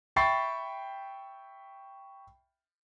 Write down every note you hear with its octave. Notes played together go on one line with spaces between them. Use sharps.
E5 G5 B5 C#6 A6 C7